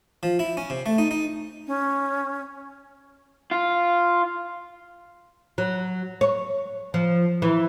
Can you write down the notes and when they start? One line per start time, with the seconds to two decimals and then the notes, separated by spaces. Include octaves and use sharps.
0.23 F3
0.39 E4
0.57 C#4
0.70 C3
0.86 A3
0.98 D#4
1.11 D#4
1.67 C#4
3.51 F4
5.58 F#3
6.21 C#5
6.94 F3
7.42 E3